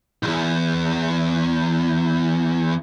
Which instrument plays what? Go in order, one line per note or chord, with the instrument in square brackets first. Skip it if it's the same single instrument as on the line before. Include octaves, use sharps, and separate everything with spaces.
[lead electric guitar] B1 E2